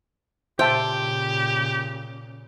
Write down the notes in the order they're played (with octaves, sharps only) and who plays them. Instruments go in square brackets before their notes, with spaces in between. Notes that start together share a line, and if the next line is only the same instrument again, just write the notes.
[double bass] A#2 C#3 [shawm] G4 [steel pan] C5 E5 A5 [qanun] G5